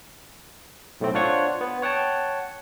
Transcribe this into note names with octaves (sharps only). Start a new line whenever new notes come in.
B1 A2 A3 C4
D4 F4 C5 C#5 F#5 C#6
B3
C#5 F#5 G5 A5